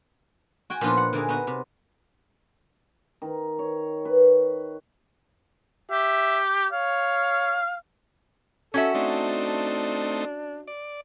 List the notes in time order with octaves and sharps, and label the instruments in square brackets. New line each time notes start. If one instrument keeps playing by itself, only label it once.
[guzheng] F#4 G5 G#5
A#2 F3 B3 D4 D#4 F4
F#5
D3 A#3 G#4
B3 D#4 F#4
C3
[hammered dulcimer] D#3
C#5
B4
[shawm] G4 [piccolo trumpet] E5
[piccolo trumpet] C#5 [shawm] F5
[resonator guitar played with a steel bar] C#4 F#4 E5 [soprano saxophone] A4
[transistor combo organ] A3 C4 D#4 [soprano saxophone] D4
[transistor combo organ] D5